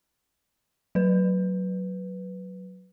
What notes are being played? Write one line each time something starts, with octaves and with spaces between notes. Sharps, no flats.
F#3 B4